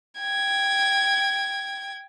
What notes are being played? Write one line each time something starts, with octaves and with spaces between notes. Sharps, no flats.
G5 G#6